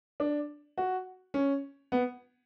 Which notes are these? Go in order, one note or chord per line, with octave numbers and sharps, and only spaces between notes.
D4
F#4
C#4
B3